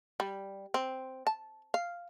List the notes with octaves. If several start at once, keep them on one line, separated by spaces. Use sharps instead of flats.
G3
C4
A5
F5